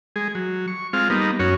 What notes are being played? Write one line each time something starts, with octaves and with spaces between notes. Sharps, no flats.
G#3 G#4
F#3
C#6
G#3 C4 F4 F5
G3 A#3 B3 D#4
F#2 C#4 F#4 C#5